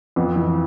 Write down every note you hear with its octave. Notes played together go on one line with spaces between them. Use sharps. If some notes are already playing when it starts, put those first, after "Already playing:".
F2 B3
E3